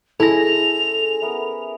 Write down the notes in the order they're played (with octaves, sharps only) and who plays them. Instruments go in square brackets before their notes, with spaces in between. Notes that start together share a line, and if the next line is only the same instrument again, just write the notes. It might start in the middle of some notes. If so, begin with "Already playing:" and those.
[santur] G#3 C#4 G#4 [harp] E4 A#6 [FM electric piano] A4 [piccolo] F7
[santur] B3 A#4 E5